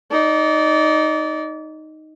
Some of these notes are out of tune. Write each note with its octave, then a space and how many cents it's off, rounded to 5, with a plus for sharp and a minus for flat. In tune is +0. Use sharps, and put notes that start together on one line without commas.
D#4 +0 D5 -25